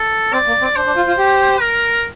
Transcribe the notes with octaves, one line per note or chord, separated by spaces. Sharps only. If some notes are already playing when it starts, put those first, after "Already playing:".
Already playing: A4
C4 D5
A#3
C4
D5
D4 C5
D4
F4
F4
G4
A#4